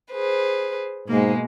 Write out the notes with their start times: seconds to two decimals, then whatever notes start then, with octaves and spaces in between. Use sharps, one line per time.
0.11 G#4 B4 C5
1.08 G#2 B2 G#3 A#3